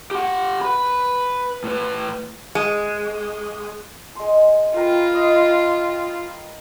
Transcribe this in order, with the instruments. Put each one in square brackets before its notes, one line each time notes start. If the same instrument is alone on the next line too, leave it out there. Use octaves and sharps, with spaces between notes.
[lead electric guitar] G4 F#5
B4 B5
A2 B4
[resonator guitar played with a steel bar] G#3
[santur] G#3 C6
[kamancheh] F4 [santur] A#4 B4 G5
[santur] D#5